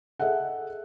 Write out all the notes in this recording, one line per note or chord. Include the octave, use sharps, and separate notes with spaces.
G#4 A4 D#5 E5 F#5